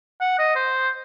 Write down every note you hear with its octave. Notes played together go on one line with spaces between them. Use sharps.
F#5
D#5
C5